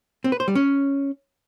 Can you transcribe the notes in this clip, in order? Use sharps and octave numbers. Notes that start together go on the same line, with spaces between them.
C4
B4
C5
G3
C#4